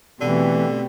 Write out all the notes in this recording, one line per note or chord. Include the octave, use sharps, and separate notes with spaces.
B2 D3 E3 A3 C4 G4